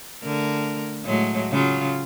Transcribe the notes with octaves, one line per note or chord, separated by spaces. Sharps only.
D3 A3 A#4
A2 F#3 G#3
C#3 F#3 F4